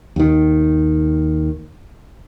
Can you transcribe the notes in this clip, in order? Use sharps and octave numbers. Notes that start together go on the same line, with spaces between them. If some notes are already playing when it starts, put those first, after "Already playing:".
D#2 D#3